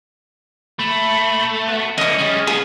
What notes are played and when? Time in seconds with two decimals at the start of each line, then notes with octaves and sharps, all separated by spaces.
0.79 A#2 A3 B5
1.68 B3 F#4
1.98 D3 E3 C#4 D#5 D#6
2.18 G3 G#3
2.47 F3 B3 G#4